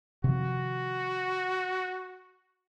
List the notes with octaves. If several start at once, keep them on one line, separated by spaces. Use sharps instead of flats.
C3 D#3 F3 F#4